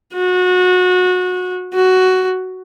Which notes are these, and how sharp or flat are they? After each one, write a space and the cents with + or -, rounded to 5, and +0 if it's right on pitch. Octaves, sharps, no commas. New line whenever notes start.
F#4 -25
F#4 +10